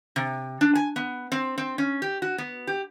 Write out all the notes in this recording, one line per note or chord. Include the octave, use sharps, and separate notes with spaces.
C3
D4
G#5
B3
C4
C4
C#4
G4
F#4
B3
G4